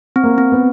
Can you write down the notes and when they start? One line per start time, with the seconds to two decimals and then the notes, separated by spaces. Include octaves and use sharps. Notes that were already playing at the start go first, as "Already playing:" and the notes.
0.16 C4
0.24 A#3
0.38 C4
0.52 B3